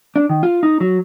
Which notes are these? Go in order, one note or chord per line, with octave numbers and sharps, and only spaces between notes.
D4
D#3
F4
D#4
F#3